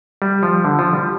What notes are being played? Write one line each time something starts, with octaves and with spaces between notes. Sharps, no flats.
G3
F3
D3
F3
G3